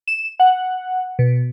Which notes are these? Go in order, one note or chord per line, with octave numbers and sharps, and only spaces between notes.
E7
F#5
B2